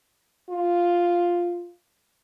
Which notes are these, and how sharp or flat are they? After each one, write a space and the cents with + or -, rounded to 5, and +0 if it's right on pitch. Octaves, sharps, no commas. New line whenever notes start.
F4 +0